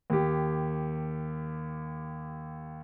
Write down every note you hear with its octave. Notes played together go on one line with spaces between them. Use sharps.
D#2 G4